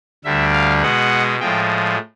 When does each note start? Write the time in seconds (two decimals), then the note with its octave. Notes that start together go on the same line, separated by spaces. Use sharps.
0.24 D2 D3 G3 E5
0.53 F5
0.82 B2 G#3 F#5
1.40 A2 F3 G#3 G5